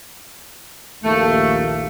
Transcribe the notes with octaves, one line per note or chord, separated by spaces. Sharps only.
A#1 D#2 A3 A#3